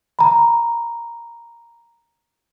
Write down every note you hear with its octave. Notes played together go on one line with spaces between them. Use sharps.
A#5 B5